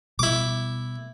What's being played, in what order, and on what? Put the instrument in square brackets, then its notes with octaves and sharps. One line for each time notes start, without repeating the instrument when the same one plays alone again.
[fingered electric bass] B2 G3 [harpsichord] E4 D6